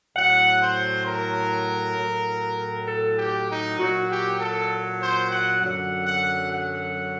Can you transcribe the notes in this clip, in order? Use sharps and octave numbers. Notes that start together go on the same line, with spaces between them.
A2 F#3 F#5
C5
A#4
A2 F#3
A4
G4
D#4
A#2 F#3 F#4
G4
A4
C5
F#5
F#2 D3 F#3 F#5
F#5
F#5